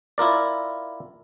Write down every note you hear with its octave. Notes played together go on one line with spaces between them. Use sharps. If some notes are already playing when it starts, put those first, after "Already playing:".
E4 F4 A#4 D5